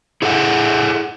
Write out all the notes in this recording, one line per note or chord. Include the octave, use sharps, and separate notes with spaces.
E4 G#4 A4 D#5 F#5